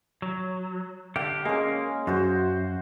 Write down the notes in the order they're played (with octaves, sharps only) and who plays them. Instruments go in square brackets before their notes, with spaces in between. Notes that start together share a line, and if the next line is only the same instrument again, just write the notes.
[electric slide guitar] F#3
[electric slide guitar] D3 G4 [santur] F5
[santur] G#3 C#4 [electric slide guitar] A#3
[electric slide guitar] F#2 [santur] F#4 C5